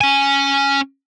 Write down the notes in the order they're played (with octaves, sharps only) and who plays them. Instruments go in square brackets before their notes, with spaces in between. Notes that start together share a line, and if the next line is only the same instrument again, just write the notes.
[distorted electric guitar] C#4 G#5